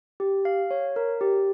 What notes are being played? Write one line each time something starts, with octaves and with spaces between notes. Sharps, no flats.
G4
F5
C#5
A#4
G4